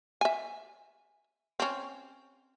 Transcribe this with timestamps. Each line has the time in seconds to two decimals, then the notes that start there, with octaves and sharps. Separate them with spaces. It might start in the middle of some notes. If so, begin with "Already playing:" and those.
0.21 E5 G#5
1.60 C4 C#4